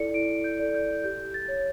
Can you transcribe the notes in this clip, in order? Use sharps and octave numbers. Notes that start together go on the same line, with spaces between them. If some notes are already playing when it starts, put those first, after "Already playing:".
Already playing: E4 A4 D5 C#7
E4 D7
G6
A4 D5
G6
G4 G6
A6
C#5